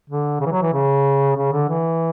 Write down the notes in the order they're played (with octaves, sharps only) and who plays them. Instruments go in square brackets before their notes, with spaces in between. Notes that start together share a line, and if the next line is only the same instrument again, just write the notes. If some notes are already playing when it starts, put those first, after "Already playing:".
[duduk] D3
C#3
E3
F#3
E3
C#3
C#3
D3
E3